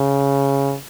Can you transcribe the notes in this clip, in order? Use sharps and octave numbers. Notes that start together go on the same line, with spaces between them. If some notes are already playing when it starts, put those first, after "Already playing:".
Already playing: C#3